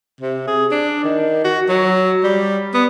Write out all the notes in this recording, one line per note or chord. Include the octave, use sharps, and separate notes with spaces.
C3
G#4
D4
D#3
F#4
F#3
G3
B3